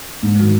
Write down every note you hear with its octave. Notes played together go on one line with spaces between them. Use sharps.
G#2
D#3 F#3